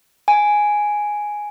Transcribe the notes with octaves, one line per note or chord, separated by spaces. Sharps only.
G#5